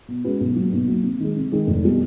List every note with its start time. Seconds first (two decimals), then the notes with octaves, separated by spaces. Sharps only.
0.08 B2
0.24 G#3 C#4 F#4 B4
0.40 B1
0.56 A#2 F#3
0.73 B1
0.88 A#2 F#3
1.04 C3
1.20 D#3 G#3
1.36 C3
1.52 D#3 G#3
1.67 F1
1.84 B2 G3